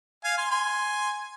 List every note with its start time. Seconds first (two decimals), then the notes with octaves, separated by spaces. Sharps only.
0.24 F5 G#5
0.38 G#5 C6
0.51 G#5 C6